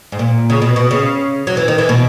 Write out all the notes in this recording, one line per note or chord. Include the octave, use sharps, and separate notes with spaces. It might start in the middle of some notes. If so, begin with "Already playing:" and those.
G#2
A#2
C#3
B2
B2
C#3
F#3
E3
D#3
E3
B2